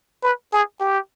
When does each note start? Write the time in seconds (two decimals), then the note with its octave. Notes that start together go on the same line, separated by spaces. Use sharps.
0.23 B4
0.53 G#4
0.81 G4